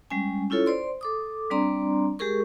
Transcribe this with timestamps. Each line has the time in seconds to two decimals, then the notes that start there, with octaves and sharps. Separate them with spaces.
0.10 G3 G#3 C#4 G#5
0.50 C#4 E4 F4 A4 C#5
0.66 C5 D5 C6
1.01 A4 D6 D#6
1.51 G3 C4 D4 D5 A#5 C6
2.19 G#3 G4 G#4 A#4 C#6